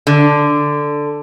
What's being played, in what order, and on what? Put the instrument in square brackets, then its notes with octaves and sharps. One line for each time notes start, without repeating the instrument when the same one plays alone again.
[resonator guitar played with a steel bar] D3